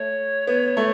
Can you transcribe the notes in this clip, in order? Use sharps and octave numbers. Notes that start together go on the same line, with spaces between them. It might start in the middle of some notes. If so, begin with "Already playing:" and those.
Already playing: A3 C#5
B3
A3